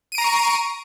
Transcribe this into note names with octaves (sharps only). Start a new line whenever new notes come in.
A#5 C#6 C7 D7 D#7